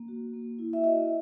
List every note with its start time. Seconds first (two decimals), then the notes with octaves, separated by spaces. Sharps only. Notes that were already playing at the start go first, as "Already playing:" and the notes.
Already playing: A#3
0.08 F#4
0.33 A#3
0.59 E4
0.73 E5
0.84 F#4 D#5